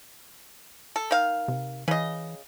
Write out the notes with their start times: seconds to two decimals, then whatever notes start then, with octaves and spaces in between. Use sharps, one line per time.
0.96 A4
1.11 D#3 F5
1.48 C3
1.88 C#3 E3 D#5